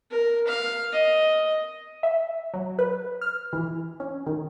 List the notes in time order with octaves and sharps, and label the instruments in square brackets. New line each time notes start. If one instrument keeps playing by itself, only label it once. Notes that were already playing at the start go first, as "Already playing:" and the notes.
[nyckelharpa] A#4
F5
D#5
[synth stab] E5
F#3
B4
F6
E3
C#4
D#3